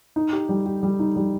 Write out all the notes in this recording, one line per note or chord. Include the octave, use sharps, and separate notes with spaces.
D#4
G4
G3
G4
G3
D#4
G3